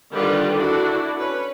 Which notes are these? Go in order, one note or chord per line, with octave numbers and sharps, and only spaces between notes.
D3 D#3 G3 F4 G4 B4
D4 E4 F#4 A4
C#4 B4 C#5